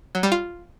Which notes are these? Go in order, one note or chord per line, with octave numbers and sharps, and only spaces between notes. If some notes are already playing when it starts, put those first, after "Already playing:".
F#3
G3
F4